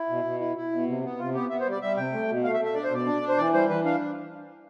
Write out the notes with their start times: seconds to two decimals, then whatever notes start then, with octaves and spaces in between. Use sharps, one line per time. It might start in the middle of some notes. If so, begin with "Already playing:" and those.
Already playing: E4
0.09 B2
0.25 B2
0.40 E4
0.56 E4
0.72 B2
0.87 C3
1.03 B3
1.19 C3 F4
1.34 B3 G4
1.50 B3 E5
1.60 C5
1.65 G3
1.72 D5
1.82 G3 E5
1.97 C3 G5
2.13 A3
2.28 B2
2.44 A3 F5
2.54 E5
2.60 A3
2.65 E5
2.74 D4 D5
2.84 C5
2.91 B2 D5
3.06 D4
3.22 D4
3.29 C5
3.37 E3 D5
3.54 G3 C5
3.69 E3 B4
3.85 D4 F5